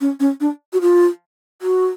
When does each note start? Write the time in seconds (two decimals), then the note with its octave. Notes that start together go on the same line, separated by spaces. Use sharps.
0.01 C#4
0.20 C#4
0.40 D4
0.73 F#4
0.81 F4
1.62 F#4